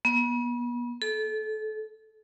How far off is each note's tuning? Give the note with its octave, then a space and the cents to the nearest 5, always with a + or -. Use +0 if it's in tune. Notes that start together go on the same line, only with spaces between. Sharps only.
B3 -35
A4 -30